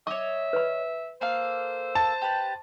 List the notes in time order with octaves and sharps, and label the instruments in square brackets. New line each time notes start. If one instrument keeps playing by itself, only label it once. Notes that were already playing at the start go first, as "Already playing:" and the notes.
[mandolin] C#5 D#5 [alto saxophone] E5 [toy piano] D6
[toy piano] B4 B5
[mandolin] A#3 A4 F5 [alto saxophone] C5
[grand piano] A5
[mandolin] G4 B4